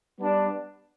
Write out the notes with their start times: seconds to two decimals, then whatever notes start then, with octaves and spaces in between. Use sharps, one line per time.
0.19 G3 B3 D4